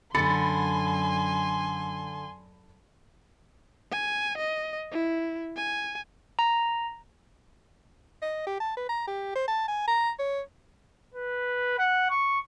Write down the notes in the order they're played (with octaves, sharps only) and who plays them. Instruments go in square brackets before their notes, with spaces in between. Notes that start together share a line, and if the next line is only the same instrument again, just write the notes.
[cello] F#2 [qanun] D3 [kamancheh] G#5 C6 [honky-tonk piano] B5 A6 C#7
[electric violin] G#5
D#5
E4
G#5
[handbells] A#5
[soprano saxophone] D#5
G4
A5
B4
A#5
G4
C5
A5
G#5
A#5
C#5
[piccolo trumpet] B4
F#5
C#6